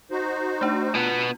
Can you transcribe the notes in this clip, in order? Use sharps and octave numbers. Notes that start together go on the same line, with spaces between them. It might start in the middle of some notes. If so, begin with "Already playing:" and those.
D#4 F#4 C5
A3 D4
B2 B3 F4